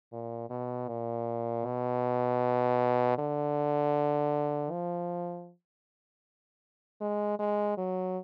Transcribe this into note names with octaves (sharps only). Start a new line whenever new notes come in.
A#2
B2
A#2
B2
D3
F3
G#3
G#3
F#3